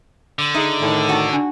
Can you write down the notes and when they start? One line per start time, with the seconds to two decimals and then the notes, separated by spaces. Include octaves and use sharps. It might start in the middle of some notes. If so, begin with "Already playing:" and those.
0.39 D3
0.55 D#4 G#4 E5
0.82 A2 D#3 D5 G5
1.09 D#4 E4 F#4 G5
1.29 D4 D5